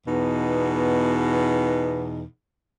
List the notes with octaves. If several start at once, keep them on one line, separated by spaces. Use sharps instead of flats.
E2 B2 D#4